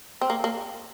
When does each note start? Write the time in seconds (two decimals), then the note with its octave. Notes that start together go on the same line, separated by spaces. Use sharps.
0.21 C4
0.30 A#3
0.44 A#3